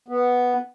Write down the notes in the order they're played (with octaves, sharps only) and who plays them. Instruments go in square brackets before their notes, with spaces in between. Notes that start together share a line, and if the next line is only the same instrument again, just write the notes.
[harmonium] B3